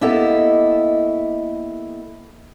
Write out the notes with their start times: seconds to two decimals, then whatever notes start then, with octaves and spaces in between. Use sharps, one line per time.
0.01 A#3 B3 E4 G4 A4 D#5